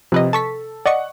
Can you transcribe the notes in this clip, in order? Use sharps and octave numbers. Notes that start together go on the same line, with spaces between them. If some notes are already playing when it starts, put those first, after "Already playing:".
C3 F3 B4 D#5
A4 A5 C#6 B6
D5 D#5 F#5 C#6